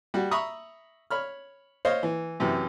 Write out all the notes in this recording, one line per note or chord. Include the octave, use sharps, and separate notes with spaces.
G3 F#4
E5 A#5 B5 C#6 D#6
C#5 B5 F6
C5 C#5 D#5 F5
E3
F#2 C3 E3